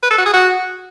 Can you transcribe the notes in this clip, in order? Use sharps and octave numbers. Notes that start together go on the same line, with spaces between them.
B4
A4
F#4
G#4
F#4